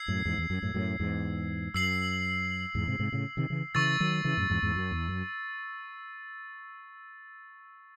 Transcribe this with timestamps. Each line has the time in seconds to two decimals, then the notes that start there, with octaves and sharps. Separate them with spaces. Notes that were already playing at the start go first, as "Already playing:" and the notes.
Already playing: E6 G#6 C7
0.08 F#2 A2
0.25 E2 G#2
0.38 E2
0.50 F#2
0.62 F#2 A2
0.74 F#2 A2
1.00 E2 G#2
1.74 F#2 E6 C7 F#7
2.75 E2 G#2
2.88 G#2 C3
2.99 G#2 C3
3.12 A2 C#3
3.37 C3 D#3
3.50 C#3 E3
3.75 C#3 E3 C#6 E6 A6
4.00 D#3 F#3
4.24 C#3 E3
4.37 F#2 A2
4.50 E2 G#2
4.62 E2 G#2
4.76 F#2
4.91 E2
5.08 F#2